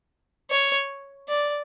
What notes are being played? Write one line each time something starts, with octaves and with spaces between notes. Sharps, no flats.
C#5
D5